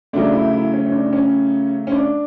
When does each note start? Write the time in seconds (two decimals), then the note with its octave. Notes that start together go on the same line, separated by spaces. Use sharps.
0.13 C#3 F#3 A3 D4
0.32 E4
0.53 E4
0.73 C#4
0.86 C#4
0.92 D4
1.07 D4
1.13 C#4
1.87 C#4
1.92 D4